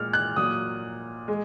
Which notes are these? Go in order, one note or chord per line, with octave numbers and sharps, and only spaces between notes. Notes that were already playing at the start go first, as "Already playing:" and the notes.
Already playing: A#2 G#3 F6
F#6
A#2 F#3 D#6
G#3